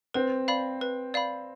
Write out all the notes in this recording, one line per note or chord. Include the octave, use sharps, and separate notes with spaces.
C4 B4
D5 F5 B5
B4
D5 F5 B5